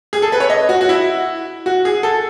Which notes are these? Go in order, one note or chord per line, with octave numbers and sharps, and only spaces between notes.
G#4
A4
B4
C#5
D#5
F#4
F#4
E4
F#4
G#4
A4